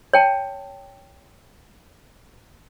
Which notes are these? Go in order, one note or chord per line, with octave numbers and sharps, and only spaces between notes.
C#5 G5 A5